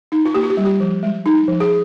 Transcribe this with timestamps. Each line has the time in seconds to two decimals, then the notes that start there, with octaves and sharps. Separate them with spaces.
0.12 D#4
0.25 F4
0.34 A#3 G4
0.43 F4
0.50 G4
0.57 G3
0.65 G4
0.80 F3
1.03 G#3
1.26 D#4
1.48 F3
1.60 G#4